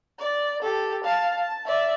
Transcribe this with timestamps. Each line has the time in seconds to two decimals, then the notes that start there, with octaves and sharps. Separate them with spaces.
0.19 D5
0.62 G4 A4
1.04 F5 A5
1.35 A5
1.66 D5 E5